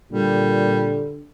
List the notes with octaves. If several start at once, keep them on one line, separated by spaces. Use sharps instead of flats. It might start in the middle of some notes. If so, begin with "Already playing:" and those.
A#2 D3 G3